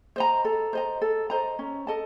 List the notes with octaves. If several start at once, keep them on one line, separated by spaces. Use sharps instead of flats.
C5 D#5 A#5
A4
C5 D#5 A#5
A4
C5 D#5 A#5
C#4
A4 D#5 A5